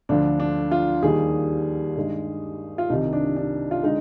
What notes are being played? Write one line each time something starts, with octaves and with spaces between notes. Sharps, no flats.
D2 D3 F3 D4
D4
F4
D#2 D#3 G3 G#4
G2 D#3 G#3
F4
C2 C3 D#3 D#4
D4
D4
F4
D3 G#3 D#4